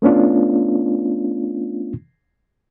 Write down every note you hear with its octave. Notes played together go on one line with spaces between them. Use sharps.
A3 B3 C#4 D4 F4